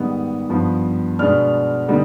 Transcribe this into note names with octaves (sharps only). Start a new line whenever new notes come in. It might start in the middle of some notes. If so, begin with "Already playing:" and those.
Already playing: G#2 D#3 G3 B3 D#4 D#6
G2 F3 B3
B2 G#3 B3 D4 F6
D3 G3 B3 D#4